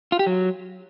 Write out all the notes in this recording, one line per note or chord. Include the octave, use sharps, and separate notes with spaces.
F4
G4
F#3